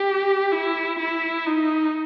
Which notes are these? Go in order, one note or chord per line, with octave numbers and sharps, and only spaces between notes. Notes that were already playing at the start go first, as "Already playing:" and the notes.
Already playing: G4
E4
E4
D#4